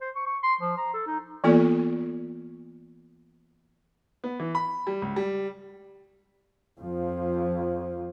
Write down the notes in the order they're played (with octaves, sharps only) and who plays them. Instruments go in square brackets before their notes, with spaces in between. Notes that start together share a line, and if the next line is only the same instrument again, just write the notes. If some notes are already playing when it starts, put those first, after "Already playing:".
[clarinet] C5
C#6
C#6
C6
F3
A#5
A4
D#4
[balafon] E3 A#3 B3 F4 A4 D5
[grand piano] B3
E3
B5
G3
C#2
G3
[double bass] F2 F3